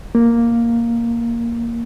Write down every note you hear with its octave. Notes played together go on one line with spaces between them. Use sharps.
A#3